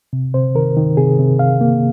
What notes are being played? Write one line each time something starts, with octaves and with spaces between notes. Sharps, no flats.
C3
C3 C5
D#3 A#4
D#3
C3 G#4
C3
C3 F5
A#3